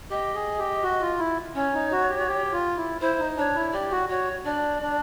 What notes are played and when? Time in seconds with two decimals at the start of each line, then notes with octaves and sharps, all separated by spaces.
0.10 G4 D#5
0.35 G#4
0.58 G4
0.83 F#4
1.01 F4
1.19 E4
1.55 C#4 C#5
1.74 D#4
1.92 F#4
2.10 G4
2.19 F#4
2.28 G4
2.52 F4
2.77 E4
3.01 E4 C5
3.19 D#4
3.37 D4 C#5
3.55 E4
3.73 G4 D5
3.91 F#4
4.09 F#4 C#5
4.45 D4 D5
4.82 D4